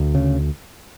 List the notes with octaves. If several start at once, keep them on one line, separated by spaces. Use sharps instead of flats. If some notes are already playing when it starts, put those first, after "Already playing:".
Already playing: D2
C#3